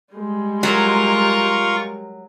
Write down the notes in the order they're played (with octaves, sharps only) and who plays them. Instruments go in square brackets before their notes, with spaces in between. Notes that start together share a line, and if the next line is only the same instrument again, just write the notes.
[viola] G3 G#3
[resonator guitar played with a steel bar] F#3 [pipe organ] F4 C#6 [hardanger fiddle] A#4